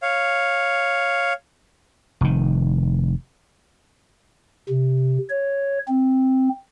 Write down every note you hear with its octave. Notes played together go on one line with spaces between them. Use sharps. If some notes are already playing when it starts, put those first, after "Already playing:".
C#5 F5
F1 D#3
C3
C#5
C4